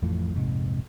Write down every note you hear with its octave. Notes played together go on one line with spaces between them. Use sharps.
A1 F2 A2 F3
F1 A#1 G#2 C3